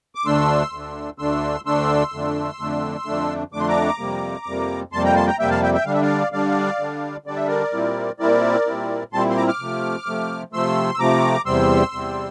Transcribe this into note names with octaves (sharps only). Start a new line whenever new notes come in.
D6
D2 D3 A3 D4 C6 E6
D2 D3 A3 D4
D2 D3 A3 D4 C6 E6
D2 D3 A3 D4 C6 E6
F2 D3 A3 D4
F2 D3 A3 D4
F2 D3 A3 D4
F2 D3 A3 D4 D6
C6
A#5 D6
F2 C3 G3 A#3
F2 C3 G3 A#3
F2 C3 G3 A#3 A5 C6
G5 A#5
A5 C6
G5 A#5
F2 C3 G3 A#3 E5 G5
F5 A5
E5 G5
E5 G5
D3 G3 D4 F5
E5
D5 F5
D3 G3 D4 D5 F5
D3 G3 D4
D3 G3 D4 D5
E5
A#4 D5
A#2 G3 C4 E4
A#2 G3 C4 E4 A#4 D5
A#2 G3 C4 E4
A#2 G3 C4 E4 A5 C6
C6
A#5 D6
D6 F6
C3 F3 A3
C3 F3 A3
C3 F3 A3 C6 E6
E6
C3 F3 A3 A#5 D6
E2 C3 G3 C4 C6 E6
E2 C3 G3 C4